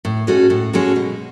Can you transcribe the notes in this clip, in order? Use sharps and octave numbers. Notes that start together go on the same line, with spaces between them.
A2
G#3 C#4 F#4 A4
A2
G#3 C#4 F#4 A4
B2